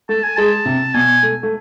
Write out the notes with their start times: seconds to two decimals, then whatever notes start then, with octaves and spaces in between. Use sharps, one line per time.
0.09 A3 A5
0.24 G#5
0.37 G#3 A5
0.65 C3
0.94 B2 G#5
1.23 A3
1.43 A3